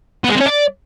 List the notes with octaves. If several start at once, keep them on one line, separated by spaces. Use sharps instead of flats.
B3
G#3
C4
C#4
D5